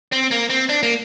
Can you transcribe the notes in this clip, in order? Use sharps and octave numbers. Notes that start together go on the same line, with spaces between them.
C4
A#3
C4
D4
A#3